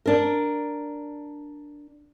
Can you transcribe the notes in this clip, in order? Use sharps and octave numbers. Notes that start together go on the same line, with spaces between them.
D4 A#4